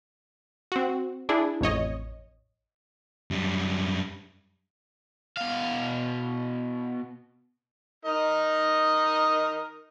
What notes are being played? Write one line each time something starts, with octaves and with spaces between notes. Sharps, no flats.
C4 F#4
D4 E4 G#4
A1 F2 C#5 D#5
F#2 G3
B2 F5
D#4 A#4 D#5